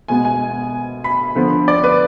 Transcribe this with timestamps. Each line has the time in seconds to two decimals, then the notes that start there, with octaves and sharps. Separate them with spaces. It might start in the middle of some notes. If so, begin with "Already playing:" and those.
0.08 B2 G#3 B3 G#5
0.25 G#5
1.04 B5
1.35 D3 F3 B3
1.68 D5
1.84 B4